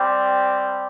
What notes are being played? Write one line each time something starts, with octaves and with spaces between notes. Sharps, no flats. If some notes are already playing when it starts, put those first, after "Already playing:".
Already playing: G3 C4 G4